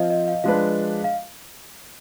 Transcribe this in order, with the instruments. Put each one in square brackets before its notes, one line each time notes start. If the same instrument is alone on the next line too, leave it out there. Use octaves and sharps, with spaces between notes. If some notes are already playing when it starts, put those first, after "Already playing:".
Already playing: [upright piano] F3 C4 F4 [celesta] D#5
[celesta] D#5
F5
[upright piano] F3 G#3 D4 F4 B4 [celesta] F5
[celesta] F5